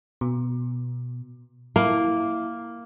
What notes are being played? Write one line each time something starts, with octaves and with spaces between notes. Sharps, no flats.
B2
A#3 E4